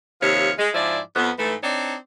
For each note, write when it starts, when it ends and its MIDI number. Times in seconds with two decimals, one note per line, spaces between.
0.22 0.51 39
0.22 0.51 48
0.22 0.51 53
0.22 0.51 73
0.22 0.51 77
0.59 0.69 56
0.74 0.99 44
0.74 0.99 53
0.74 0.99 64
0.74 0.99 74
1.16 1.31 41
1.16 1.31 59
1.39 1.54 44
1.39 1.54 52
1.39 1.54 57
1.63 1.95 60
1.63 1.95 62
1.63 1.95 63
1.63 1.95 73
1.63 1.95 74